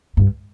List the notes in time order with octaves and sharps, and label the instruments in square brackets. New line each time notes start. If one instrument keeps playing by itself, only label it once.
[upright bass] G2